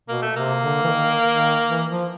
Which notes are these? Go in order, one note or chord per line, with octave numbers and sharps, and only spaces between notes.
B2 A#3
A3
C3 A#3
D3
E3
D#3
D#3
E3
F3